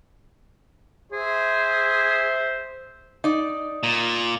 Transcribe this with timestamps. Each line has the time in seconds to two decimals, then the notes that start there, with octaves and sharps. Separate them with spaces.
1.12 G#4 C5 E5
3.24 D#4 D5
3.83 A#2